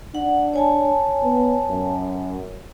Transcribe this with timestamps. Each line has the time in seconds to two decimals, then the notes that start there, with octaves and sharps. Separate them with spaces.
0.15 D4 F#5
0.53 C#5 G#5 A5
1.23 B3
1.70 F#2